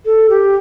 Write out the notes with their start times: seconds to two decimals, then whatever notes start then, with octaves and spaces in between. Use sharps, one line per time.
0.06 A4
0.30 G4